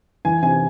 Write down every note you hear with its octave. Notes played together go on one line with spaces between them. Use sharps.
E3 G#5
C3 G#5